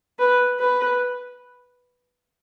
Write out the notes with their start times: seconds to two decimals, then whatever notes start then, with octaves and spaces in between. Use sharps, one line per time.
0.19 B4
0.59 B4